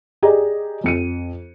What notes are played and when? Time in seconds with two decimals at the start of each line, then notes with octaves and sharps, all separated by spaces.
0.23 G4 G#4 D5 D#5 A#5
0.84 F2 C#7 D#7